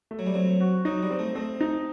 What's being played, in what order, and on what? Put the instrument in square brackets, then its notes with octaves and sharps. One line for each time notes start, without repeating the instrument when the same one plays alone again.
[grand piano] A3
[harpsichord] F#3
G3
[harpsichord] F#3 [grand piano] C4
[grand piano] F#4
[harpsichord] F#3 [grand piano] D#4
[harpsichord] G3
[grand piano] C4
[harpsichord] A3
[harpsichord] A3 [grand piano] C4
[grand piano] D#4